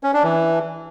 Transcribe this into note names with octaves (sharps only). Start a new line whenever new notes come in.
C#4
D4
E3